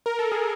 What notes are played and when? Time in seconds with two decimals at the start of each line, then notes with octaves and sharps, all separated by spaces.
0.06 A#4
0.19 A4
0.32 G#4